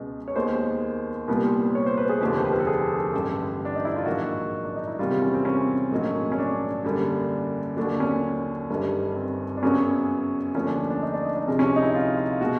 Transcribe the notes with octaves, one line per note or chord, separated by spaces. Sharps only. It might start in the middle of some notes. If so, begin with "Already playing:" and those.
Already playing: C#2 B2 G#3 B3
C#5
D#2 D#3 G#3 B3 C5
C2 A#2 G3 B3
C#5
C5
B4
G#4
F1 D#2 D3 F3 A#3 G4
C5
B4
A#4
A4
G#4
A1 G2 D3 G4
D4
D#4
E4
F4
A#1 G#2 D#3 F#3 F#4
D4
D#4
E4
E2 C3 D#3 G3 F4
C4
C#4
C4
C#4
A#1 G#2 D#3 F#3 A3
C#4
D4
F#2 D3 G3 A#3
D#2 D3 F#3 D4
C#4
G1 G2 D#3 G3
C4
D4
F#2 C#3 F#3 B3 C#4
D#2 D3 F3 A3 C#4
D4
D4
D#4
D4
D#4
D4
C#2 C3 F3 G#3 C#4
C#4
D#4
E4
F4
F4
B2 G#3 F#4